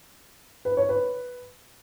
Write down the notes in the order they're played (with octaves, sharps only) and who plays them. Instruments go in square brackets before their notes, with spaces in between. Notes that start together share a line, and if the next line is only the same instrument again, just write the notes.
[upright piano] B4
C#5
B4